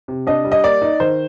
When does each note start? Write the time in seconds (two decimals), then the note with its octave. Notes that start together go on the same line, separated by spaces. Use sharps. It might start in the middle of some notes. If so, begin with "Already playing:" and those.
0.08 C3
0.27 D4 D#5
0.45 G3
0.52 D#5
0.64 A#3 D5
0.82 D#4
1.00 D#3 C5